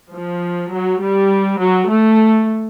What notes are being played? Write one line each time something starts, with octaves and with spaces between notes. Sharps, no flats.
F3
F#3
G3
F#3
A3